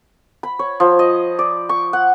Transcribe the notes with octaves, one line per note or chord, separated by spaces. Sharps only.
B5
C#5
F3
D#5
D5
C#6
F#5